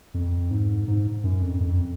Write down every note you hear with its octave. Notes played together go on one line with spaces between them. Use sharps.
F2
G#2
G#2
F#2
F2
F2